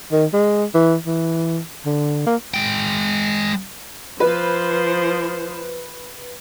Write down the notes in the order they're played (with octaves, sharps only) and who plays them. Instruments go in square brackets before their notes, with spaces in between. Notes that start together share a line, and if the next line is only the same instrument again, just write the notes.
[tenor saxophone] D#3
G#3
E3
E3
D3
A#3
[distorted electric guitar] G#3 G5
[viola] F3 C5 [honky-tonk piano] B4